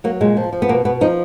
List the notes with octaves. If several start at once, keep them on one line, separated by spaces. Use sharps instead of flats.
F#3 A#3
A#2 G#3
F3
F3
B3
B2 A#3
B2 B3
F3 D#4